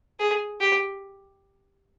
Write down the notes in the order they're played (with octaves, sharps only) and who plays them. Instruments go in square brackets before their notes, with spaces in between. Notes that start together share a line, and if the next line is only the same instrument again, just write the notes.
[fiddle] G#4
G4